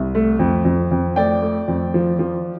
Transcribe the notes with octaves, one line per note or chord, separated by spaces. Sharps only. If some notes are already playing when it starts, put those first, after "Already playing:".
Already playing: C2
A3
F2
F2
F2
A3 D5 G5
A3
F2
F3
F3